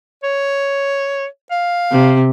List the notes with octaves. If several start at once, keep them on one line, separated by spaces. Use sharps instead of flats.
C#5
F5
C3